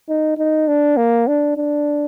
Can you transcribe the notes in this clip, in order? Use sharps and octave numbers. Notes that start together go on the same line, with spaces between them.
D#4
D#4
D4
A#3
D4
D4